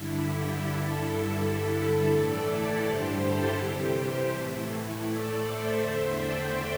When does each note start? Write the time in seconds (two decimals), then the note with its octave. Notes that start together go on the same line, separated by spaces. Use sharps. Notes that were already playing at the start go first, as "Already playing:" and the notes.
Already playing: G2 D3 G3 E4
0.25 G4
0.62 G2 D3 G3 E4 A4
0.98 E4
1.35 G2 D3 G3 E4 A4
2.09 A2 E3 A3 A4 D5
2.46 E4 A4
2.83 G2 D3 G3 G4 C5
3.19 E4 A4
3.56 C3 E3 G3 G4
3.93 G4 C5
4.30 A2 E3 A3
4.67 E4
5.04 A2 A3 A4 D5
5.40 C5 E5
5.77 E2 D3 A3 C5 E5
6.14 D5 G5